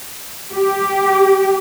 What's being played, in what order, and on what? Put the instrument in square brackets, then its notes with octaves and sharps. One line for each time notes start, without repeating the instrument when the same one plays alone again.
[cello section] G4